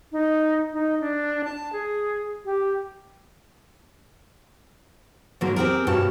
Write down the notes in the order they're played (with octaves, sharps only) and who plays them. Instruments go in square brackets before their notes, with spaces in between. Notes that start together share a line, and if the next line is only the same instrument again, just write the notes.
[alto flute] D#4
D#4
D4
A5
G#4
G4
[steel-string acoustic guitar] G#2 B2 D3 F#3 A#3
C4 G4 G#4 A#4
G2 B2 C#4 F5 A5